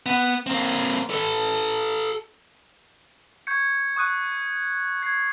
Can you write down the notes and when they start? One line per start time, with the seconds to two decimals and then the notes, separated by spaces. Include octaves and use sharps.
0.06 B3
0.47 A#3 C4
1.10 A4 B4
3.47 C#6 G6 G#6 C#7
3.96 C#6 D#6 F#6 D#7
5.02 G#6 C7